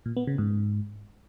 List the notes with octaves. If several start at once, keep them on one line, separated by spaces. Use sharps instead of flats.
A#2
B3
C#3
G#2